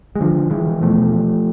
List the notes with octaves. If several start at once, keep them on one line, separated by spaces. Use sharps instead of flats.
G#3
D3 F3
E3 G#3
E2 B2 F3 A3